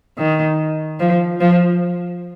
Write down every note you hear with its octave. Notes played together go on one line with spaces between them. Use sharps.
D#3
F3
F3